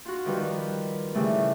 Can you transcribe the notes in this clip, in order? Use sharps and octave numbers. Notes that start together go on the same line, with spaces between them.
F4 F#4
D#3 F3 G3 B4
A2 C#3 E3 G3 A3